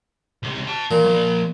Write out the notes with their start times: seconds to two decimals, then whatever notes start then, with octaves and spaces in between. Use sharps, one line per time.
0.43 C#2 C3
0.67 D#5 A5
0.91 A#2 E3
1.05 F3 A#3